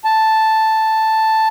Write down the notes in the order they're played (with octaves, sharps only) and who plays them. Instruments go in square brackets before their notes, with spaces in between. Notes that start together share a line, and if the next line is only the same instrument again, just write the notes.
[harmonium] A5